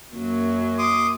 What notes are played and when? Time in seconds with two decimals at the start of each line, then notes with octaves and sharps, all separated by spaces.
0.13 F#2 F#3 A#3
0.78 C6 D6 D#6